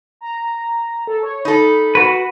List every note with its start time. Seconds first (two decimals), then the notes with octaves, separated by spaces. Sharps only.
0.21 A#5
1.07 A4
1.23 C#5
1.45 D#4 A4 B5
1.95 F#4 B4